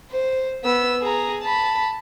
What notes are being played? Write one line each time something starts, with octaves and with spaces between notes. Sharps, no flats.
C5
B3 E6
G#4 A#5
A5 B5